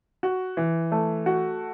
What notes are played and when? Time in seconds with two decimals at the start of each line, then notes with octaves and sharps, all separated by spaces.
0.23 F#4
0.57 E3
0.92 A3
1.26 F#4